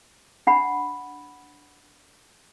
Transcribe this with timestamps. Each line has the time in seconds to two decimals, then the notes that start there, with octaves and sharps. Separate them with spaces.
0.47 D4 F#5 B5